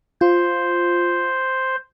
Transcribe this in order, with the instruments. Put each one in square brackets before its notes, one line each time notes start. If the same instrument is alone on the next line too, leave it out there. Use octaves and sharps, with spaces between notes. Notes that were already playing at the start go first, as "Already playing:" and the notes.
[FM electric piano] F4 [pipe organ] C5